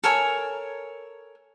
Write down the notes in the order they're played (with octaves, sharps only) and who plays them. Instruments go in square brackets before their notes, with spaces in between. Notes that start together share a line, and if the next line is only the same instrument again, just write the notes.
[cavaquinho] A4 A#4 C#5 G#5